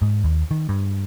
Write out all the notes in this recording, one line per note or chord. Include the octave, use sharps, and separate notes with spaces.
G#2
D#2
D#3
G2